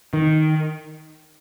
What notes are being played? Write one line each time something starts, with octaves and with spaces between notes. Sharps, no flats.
D#3